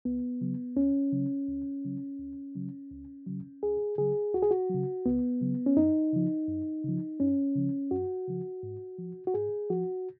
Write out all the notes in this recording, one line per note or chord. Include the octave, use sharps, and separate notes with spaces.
C#2 B3
C#3 F#3
C#2 C#4
C#3 F#3
C#2
C#3 F#3
C#2
C#3 F#3
C#2
C#3 F#3
C#2 G#4
C#3 F#3 G#4
C#2 F#4
G#4
F#4
C#3 F#3
C#2 B3
C#3 F#3
C#4
F#2 D#4
C#3 F3
F#2
C#3 F3
F#2 C#4
C#3 F3
F#2 F#4
C#3 F3
G#2
F3
F#4
G#2 G#4
F3 F#4